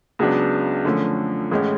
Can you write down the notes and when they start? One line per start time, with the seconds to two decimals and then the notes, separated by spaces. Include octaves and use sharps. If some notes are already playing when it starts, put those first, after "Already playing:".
0.19 C#2 C#3 F#3 B3 D4
0.85 F#2 D3 F3 A3 C#4
1.51 A1 A2 G#3 C#4